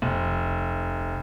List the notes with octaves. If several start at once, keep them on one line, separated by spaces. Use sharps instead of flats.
F1